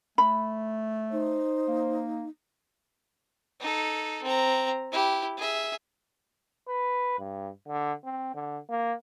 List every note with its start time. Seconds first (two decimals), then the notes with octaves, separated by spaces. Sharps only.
0.18 A3 B5
1.12 D#4 C5
1.68 A#3
3.60 D#4 A4
4.23 C4 A#5
4.92 E4 G4
5.37 G#4 E5
6.68 B4
7.19 G2
7.68 D3
8.04 C4
8.34 D3
8.70 A#3